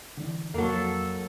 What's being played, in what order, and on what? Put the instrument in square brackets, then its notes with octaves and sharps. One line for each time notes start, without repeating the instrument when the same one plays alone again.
[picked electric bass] D3 E3 D4
[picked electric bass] F2 [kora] F#3 A#3 [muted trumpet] A4